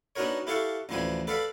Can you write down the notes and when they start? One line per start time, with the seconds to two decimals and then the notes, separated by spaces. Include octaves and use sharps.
0.16 B3 D4 D#4 F#4 A#4 C#5
0.47 E4 G4 A4 F5 F#5 C#6
0.89 A1 D2 F3 B3 D4 G#5
1.27 A4 B4 D5 F5 F#5 B5